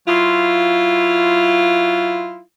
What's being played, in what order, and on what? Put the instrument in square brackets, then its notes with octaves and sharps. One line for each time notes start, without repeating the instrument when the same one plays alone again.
[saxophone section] F#3 E4 F4